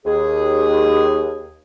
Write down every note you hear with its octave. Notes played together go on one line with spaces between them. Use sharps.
D#2 G#4